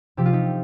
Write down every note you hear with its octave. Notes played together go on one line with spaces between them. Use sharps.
C3 F3 G4
F4
D#4 G4